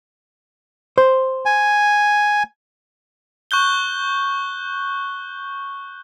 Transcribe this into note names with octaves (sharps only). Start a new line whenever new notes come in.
C5
G#5
C#6 F#6 G6 G7